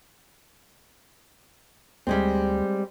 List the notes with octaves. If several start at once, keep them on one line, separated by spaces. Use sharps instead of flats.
D2 G3 G#3 C4